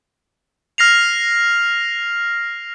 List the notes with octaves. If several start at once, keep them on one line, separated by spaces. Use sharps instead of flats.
F6 A#6 C7 F7